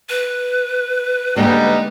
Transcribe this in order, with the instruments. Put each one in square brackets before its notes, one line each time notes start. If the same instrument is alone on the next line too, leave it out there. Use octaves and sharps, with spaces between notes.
[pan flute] B4
[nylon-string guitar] D3 G#3 B3 [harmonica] G3 D#4 G5 [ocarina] A#3